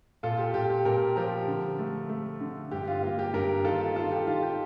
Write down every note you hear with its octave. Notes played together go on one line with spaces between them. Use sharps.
A#2 F4 A4
G4
A#2 G4
G4
A#2 G4 A#4
F3 G4 A#4
D3
A3
A3
D3
G2 G4
F4
A#3 F4
G4
G2 G4 A#4
D#3 F4 A4
F4
D#3 F4 A4
G4
D#3 F4
G4